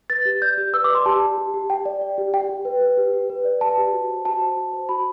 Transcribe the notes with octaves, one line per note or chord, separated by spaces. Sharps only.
B4 A6
G4
D5 G6
G4
B4 E6
D5 D6
C6
G4 A5
G4
G4
G4
G4 G5
D5
D5
G4
G4 G5
G4
B4
B4
G4
G4
B4
D5
B4 A5
G4
F#4
C5
F#4 A5
C5
F#4
C5
F#4 B5